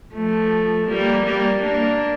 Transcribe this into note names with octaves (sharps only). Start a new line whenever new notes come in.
F3 A3
G3 A#3
G3 A#3
A#3 D4